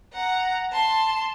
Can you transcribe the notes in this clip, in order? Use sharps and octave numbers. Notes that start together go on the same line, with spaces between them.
F#5 A#5
A5 C6